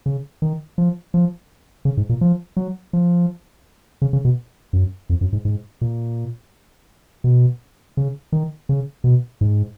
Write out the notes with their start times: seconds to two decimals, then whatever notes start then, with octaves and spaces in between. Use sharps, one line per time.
0.06 C#3
0.42 D#3
0.78 F3
1.14 F3
1.85 C#3
1.97 G#2
2.09 A#2
2.21 F3
2.57 F#3
2.93 F3
4.02 C#3
4.13 C#3
4.25 B2
4.73 F#2
5.10 F2
5.21 F#2
5.33 G#2
5.45 G#2
5.81 A#2
7.24 B2
7.97 C#3
8.32 D#3
8.69 C#3
9.04 B2
9.41 G#2